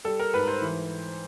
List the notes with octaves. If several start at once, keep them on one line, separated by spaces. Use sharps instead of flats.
G3 A4
A#4
G#2 B4
C5
E3